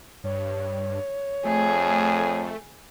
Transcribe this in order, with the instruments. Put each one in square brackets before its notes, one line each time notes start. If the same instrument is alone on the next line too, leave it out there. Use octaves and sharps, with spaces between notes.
[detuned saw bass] G2 [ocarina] C#5
[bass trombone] F2 [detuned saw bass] A3 [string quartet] G#4